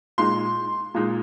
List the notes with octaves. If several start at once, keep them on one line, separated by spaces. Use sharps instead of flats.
A#2 G#3 D#4 C6
A#2 G#3 D#4